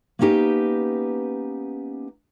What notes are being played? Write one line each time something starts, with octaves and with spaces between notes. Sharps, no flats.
A#3 B3 C#4 D#4 G4 B4